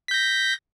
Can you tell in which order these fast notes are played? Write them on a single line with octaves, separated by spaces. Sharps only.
B6 G6 A#6